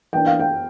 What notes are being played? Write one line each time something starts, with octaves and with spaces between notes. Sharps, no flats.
E3 A#3 D4 G5
F5
G5